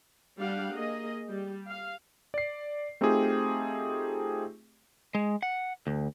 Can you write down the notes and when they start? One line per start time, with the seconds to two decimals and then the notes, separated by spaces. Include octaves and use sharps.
0.40 G3 D4 G4 F5 F#5
0.73 A#3 G#4 D#5
1.29 G3 G4
1.68 F5
2.34 D5 C7
3.01 A3 C4 D#4 F4 G4 G#4
5.15 G#3
5.43 F#5
5.87 D2